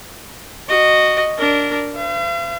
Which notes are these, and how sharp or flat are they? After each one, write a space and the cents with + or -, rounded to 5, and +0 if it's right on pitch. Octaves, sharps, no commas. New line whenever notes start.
F#4 +0 D#5 -15
D4 -15 A#4 -10
B4 +45 F5 -45